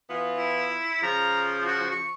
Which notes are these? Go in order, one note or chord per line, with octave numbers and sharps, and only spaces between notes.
E3 B3 F4
E4
C#3 F3 A#5
F#4
C#6